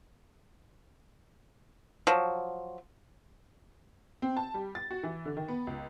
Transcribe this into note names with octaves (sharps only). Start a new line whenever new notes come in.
F3 F#3
C4
A5
G3
A6
F#4
E3
D3
D#3
B3
C#2